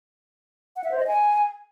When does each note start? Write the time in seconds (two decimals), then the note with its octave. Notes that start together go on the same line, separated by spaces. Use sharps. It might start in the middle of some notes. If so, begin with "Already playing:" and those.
0.76 F#5
0.84 E5
0.92 C5
0.99 D#5
1.07 G#5